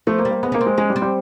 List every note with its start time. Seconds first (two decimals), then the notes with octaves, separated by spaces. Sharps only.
0.07 F3 A3
0.19 A#3
0.25 G3
0.31 A#3
0.43 G#3 B3
0.52 A#3 C#4
0.61 C4
0.66 G#3
0.78 G#3 C#4
0.90 G3
0.96 C4
1.02 G3